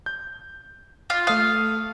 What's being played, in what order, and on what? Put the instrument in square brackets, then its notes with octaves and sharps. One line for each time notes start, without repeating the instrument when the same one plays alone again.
[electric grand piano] G6
[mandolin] F4
[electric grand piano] A3 D#6 [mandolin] F5